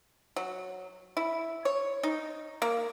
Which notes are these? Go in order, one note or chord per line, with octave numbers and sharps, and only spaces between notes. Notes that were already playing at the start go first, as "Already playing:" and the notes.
F#3
E4
C#5
D#4
A#3